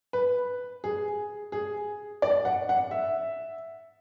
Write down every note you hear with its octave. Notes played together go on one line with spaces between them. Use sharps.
B4
G#4
G#4
D5
F#5
F#5
E5